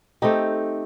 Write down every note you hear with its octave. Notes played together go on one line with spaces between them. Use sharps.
A3 C4 D#4 G4